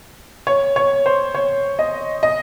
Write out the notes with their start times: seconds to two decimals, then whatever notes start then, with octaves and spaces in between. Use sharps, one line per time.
0.47 C#5
0.76 C#5
1.06 C5
1.35 C#5
1.79 D#5
2.23 D#5